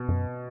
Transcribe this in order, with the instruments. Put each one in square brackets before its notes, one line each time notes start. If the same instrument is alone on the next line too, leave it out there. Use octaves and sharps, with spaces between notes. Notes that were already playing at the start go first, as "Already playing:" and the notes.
Already playing: [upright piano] B2
[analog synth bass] F#2